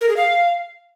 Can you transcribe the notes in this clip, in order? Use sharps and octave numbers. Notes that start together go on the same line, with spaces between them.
A#4
G#4
F5